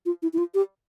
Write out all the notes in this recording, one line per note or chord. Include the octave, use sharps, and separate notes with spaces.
F4
E4
E4
F4
G4